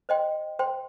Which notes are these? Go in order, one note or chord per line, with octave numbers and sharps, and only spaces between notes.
C5 D#5 G5 C6
C5 G5 C6